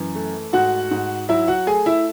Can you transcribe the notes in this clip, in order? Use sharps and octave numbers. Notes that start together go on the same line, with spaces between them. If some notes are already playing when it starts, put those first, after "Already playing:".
Already playing: F#2 E3
A3
G#2 F#4 F#5
G#2
F#3 E4 E5
F#4 F#5
A3 G#4 G#5
E4 E5